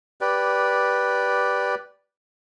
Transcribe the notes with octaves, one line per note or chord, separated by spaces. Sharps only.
G4 B4 D5